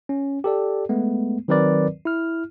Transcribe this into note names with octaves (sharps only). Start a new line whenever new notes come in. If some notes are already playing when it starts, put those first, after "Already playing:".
C#4
G4 A4 D5
G#3 A3 B3
D#3 F#3 C4 A#4 B4 D5
E4 F6